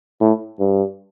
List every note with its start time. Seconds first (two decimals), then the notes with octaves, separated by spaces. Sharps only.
0.21 A2
0.59 G2